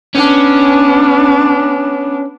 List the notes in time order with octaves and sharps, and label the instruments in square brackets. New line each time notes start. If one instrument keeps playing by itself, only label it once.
[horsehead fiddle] B3 D4 [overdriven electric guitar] C#4